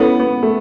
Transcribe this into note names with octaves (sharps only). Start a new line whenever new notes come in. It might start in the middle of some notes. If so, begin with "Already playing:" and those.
Already playing: B3 C#4 E4 A4 C#5
B3
A3